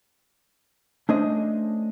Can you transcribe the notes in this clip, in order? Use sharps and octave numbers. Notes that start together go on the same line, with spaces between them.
A3 C#4 D4 C5 D#5